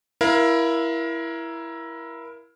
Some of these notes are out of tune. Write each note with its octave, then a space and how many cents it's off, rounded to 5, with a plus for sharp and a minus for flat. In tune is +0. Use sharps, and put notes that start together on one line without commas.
E4 +10 A#4 +25 F5 -5